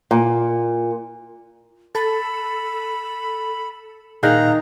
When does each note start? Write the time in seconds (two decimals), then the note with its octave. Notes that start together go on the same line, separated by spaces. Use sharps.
0.11 A#2
1.95 A4 B5
4.23 A#2 D#3 D#4 G#4 F5 A#5 F#6